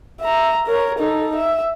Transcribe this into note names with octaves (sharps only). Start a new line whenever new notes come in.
E5 A#5
A#4 C#5
D#4 A4
E5